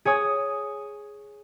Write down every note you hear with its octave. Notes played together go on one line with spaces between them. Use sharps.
G#4 C#5 G#5 D#6